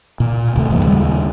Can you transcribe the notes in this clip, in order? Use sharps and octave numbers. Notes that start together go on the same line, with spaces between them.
A#2
D1 D2 C3 A3
F1 G2 E3 A#3
D#2 C#3 G3 G#3